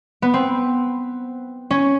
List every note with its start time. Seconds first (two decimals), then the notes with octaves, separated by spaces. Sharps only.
0.22 B3
0.34 C4
1.71 C#4